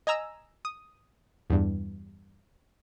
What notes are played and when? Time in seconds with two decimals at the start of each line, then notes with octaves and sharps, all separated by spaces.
0.07 D#5 G#5 A#5 E6
0.65 D#6
1.50 E2 G2